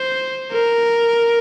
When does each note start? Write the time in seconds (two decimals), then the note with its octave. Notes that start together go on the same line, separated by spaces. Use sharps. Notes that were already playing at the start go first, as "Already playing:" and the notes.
Already playing: C5
0.52 A#4